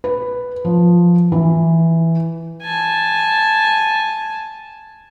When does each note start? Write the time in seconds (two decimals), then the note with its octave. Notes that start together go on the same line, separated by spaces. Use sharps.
0.04 B4
0.65 F3
1.32 E3
2.63 G#5 A5